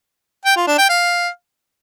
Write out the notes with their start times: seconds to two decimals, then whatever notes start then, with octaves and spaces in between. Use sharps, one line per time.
0.45 G5
0.56 F4
0.67 D4
0.78 G5
0.89 F5